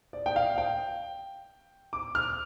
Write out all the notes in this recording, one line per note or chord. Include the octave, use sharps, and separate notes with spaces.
D5
G5
F5
G5
D6
F6